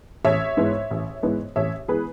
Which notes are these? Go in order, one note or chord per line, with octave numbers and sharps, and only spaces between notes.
A1 C#5 E5
G#2 E3 G#3 B3
A1
G#2 E3 G#3 B3
A1 C#5 E5
E3 G#3 B3 G#4 B4